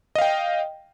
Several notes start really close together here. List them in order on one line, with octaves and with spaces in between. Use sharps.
D#5 F5 G5